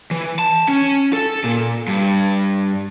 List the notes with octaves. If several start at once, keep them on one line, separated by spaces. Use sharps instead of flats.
E3
A5
C#4
A4
A#2
G2